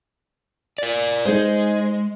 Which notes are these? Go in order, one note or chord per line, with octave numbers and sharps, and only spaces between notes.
A#4 D5
G#3 D#4 G#4 C5